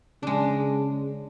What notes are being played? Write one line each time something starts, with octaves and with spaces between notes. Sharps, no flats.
C#3 G#3 D4